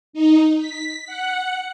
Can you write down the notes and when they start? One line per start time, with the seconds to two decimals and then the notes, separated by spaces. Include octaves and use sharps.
0.13 D#4
0.58 B6
1.06 F#5